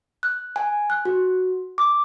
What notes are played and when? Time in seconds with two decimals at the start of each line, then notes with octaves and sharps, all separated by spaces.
0.23 F#6
0.56 G#5
0.90 F#6
1.05 F#4
1.78 D6